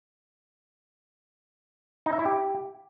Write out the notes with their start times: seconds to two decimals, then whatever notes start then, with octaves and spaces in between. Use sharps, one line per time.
2.06 D#4
2.13 E5
2.19 E4
2.26 G4